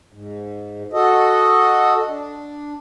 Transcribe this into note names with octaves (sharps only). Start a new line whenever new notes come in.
G#2
F#4 A4 D#5
D4